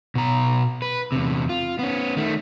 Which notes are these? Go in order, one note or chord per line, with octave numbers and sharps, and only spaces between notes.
B2 A#5
B4
E2 C3
F4
B3 C#4
D#3 A3